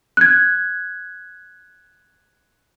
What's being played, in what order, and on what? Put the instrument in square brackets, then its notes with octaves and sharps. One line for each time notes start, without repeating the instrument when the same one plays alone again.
[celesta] F#6 G#6